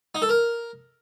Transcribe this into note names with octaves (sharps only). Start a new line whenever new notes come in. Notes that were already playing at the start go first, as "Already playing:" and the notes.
D#4
A4
A#4